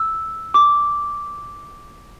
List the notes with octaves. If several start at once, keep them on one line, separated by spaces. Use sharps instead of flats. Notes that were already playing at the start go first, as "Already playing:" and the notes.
Already playing: E6
D6